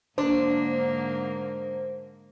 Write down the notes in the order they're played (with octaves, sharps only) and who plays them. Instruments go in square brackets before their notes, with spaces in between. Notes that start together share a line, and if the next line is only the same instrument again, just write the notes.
[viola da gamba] G#2 D3 A#3 [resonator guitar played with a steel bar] D4 [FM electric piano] C5